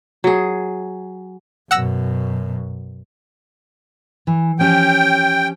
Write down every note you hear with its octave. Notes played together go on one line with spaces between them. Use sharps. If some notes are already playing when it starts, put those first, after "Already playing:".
F#3 G#4
F#2 B2 F#5 E6 A#6
E3
F3 C#4 G4 G5